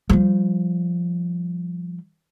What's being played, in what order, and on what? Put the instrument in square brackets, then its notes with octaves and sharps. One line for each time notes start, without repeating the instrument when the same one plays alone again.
[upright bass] F3 G3